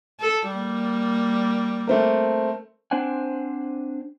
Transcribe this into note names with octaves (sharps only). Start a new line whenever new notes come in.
A4
G3 A#3
A3 C4 A#4
C4 D4 C5 D5 F#5 G#5